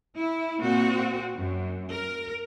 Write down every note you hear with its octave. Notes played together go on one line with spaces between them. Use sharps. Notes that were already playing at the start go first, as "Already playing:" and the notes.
E4
A#2 C4 F#4
F#2
A#4